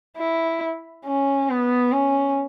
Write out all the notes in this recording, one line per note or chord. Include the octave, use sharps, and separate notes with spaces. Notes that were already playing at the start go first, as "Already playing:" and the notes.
E4
C#4
B3
C#4